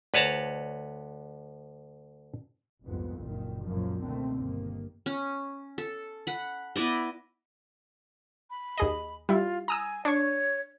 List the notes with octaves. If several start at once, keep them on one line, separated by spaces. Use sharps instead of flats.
D2 B4 C#5 A5 A#5
F1 C2 F2 G#2 B3
F#1 A#2 D#3
C#2 F#2 A#2 D#3 F3 F#3
B2 D3 D#3 A3 C4
G1 D#3 A#3
C#4
A4
F#5 B5
B3 E4 D5 D#5
B5
D#2 G#4 D#5
G3 E4 F4
G#5 A#5 D#6 E6
D4 C#5 C#6